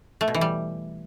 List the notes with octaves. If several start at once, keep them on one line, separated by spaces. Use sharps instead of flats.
A3
B2
E3
G3